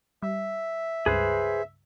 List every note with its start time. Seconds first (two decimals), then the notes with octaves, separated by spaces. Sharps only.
0.23 G3 E5
1.06 C#2 G2 G#4 B4 C5